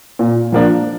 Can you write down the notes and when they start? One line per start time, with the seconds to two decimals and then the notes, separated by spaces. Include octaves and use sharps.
0.19 A#2
0.52 F3 A#3 D4